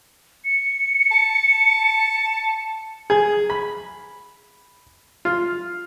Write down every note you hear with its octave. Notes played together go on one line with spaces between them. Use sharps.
C#7
A5
G#4
B5
F4